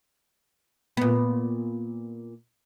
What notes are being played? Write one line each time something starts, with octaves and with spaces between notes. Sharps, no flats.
A#2 B3